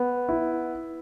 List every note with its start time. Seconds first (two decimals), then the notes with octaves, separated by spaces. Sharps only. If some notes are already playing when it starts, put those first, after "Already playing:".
Already playing: B3
0.29 E4